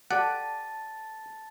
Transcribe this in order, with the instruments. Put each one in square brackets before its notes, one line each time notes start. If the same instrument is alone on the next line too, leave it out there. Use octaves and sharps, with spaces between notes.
[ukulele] G4 A4 D5 [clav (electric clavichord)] F#5 [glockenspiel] A5 A6